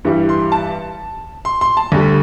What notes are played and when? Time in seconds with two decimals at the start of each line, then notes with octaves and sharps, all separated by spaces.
0.05 G2 E3 G3
0.29 C6
0.52 A5
1.45 C6
1.61 C6
1.77 A5
1.92 D2 D3 G3